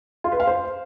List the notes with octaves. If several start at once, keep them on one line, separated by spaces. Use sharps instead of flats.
F4
B4
F5
C5